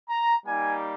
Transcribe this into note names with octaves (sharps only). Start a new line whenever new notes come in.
A#5
G3 A#3 D#4 G#5